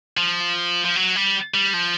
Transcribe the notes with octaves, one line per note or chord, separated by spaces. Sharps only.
F3
F3
F#3
G3
G3
F3